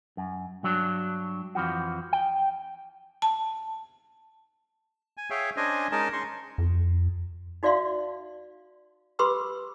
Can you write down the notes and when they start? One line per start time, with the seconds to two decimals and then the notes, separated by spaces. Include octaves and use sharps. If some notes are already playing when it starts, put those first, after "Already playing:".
0.17 F#2
0.63 G2 F#3 D4
1.55 F2 E3 F3 F#4
2.13 G5
3.22 A5
5.17 G#5
5.30 G#4 C#5 E5 F5 G5
5.57 C#4 D4 C5 D#5 G#5
5.92 G#3 C#4 D#4 A#4 D#5 A5
6.13 C#4 C6 C#6
6.58 F2
7.63 D#4 F#4 D5 E5 F5 C6
9.19 G4 B4 B5 C6 D6 E6